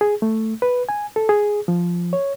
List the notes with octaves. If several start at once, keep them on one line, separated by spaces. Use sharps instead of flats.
G#4
A3
B4
G#5
A4
G#4
F3
C#5